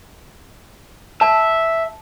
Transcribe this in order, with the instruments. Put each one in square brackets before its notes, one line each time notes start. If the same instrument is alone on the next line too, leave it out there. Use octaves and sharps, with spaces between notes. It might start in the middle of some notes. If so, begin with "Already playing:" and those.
[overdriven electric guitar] E5 [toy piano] A5